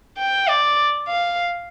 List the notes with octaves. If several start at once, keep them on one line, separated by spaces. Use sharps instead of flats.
G5
D5
F5